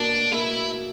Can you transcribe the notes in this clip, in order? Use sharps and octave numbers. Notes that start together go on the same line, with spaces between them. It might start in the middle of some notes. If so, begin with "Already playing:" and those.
Already playing: B2 A#3 D4
A#3 E4